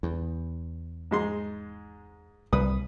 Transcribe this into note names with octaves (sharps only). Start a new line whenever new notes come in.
E2
G#2 G#3 C6
C2 G3 B4 D#6